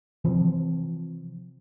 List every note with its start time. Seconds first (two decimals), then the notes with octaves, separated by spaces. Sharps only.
0.24 C3 E3 F3 C4